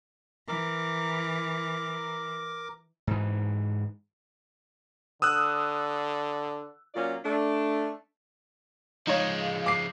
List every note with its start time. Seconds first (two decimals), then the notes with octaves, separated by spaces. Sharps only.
0.48 E3 A#4 D6
3.07 G#2 E3
5.22 D3 D#6 E6 F#6
6.94 A#2 F#3 C#4 F4 D5
7.23 A3 D4
9.07 F3 G#3 D#4 C#5 F5
9.66 D6 C7